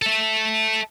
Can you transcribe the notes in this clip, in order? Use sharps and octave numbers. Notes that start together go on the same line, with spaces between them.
A4 E5